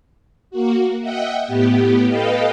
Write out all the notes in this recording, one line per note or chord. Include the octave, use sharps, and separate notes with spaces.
A#3 F#4
D#5 E5 F#5 G5
A2 B3 G4
A4 B4 D#5 F5 G5